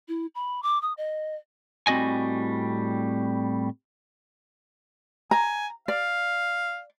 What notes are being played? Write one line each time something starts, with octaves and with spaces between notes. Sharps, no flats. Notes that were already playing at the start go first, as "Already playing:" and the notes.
E4
B5
D6
D#6
D#5
A2 G3 C4 F#4 D#5 G#5
G#5 A#5
D5 F5